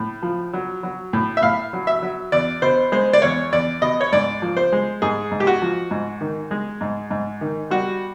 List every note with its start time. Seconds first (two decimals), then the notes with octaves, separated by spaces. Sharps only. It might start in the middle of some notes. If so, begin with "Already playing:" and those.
Already playing: A2
0.22 F3
0.53 F#3
0.83 F#3
1.13 A2
1.37 E5
1.43 A2 F5
1.73 F#3
1.87 E5
2.02 F#3
2.32 E2 D5
2.62 B2 C5
2.92 G#3 C5
3.13 D5
3.22 E2 C#5
3.52 E2 D5
3.82 B2 D#5
4.01 C#5
4.13 G#2 D5
4.42 F3
4.57 C5
4.72 G#3
5.02 G#2 G#4
5.32 G#2
5.40 G4
5.47 F#4
5.62 F3
5.91 G#2
6.21 D#3
6.51 G#3
6.81 G#2
7.11 G#2
7.41 D#3
7.70 G3 F#4